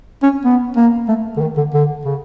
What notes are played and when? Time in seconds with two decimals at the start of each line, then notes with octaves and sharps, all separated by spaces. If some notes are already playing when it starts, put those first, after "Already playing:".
0.23 C#4
0.45 B3
0.76 A#3
1.08 A3
1.37 D3
1.41 D#3
1.57 D3
1.74 D3
2.05 C#3